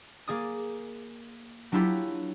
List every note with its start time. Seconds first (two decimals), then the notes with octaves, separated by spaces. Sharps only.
0.28 A#3 G#4 D5 D#6
1.72 F#3 D4 E4 F4 G4